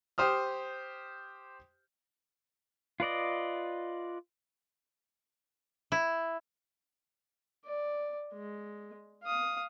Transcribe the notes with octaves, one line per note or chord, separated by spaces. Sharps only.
G4 C5 D#6 F6
F4 B4 D5 D#5
E4
D5
G#3
F5 D#6